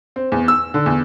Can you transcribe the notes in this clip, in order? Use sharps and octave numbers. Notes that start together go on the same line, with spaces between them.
C4
E2
E6
D3
E2